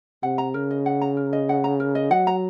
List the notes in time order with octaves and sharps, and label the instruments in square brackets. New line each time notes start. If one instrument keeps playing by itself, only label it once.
[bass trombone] C3 [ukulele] F#5
[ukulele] A#5
[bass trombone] C#3 [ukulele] A#4
[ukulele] D#5
F#5
A#5
A#4
D#5
F#5
A#5
A#4
D#5
[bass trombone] F#3 [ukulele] F#5
[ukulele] A#5